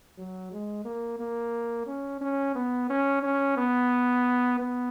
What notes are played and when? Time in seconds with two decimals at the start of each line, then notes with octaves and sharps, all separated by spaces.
0.18 F#3
0.52 G#3
0.85 A#3
1.19 A#3
1.87 C#4
2.21 C#4
2.55 B3
2.90 C#4
3.23 C#4
3.57 B3
4.59 B3